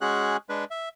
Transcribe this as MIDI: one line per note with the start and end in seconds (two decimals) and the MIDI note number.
0.01 0.37 56
0.01 0.37 61
0.01 0.37 66
0.01 0.37 68
0.01 0.37 90
0.49 0.65 56
0.49 0.65 62
0.49 0.65 71
0.71 0.89 76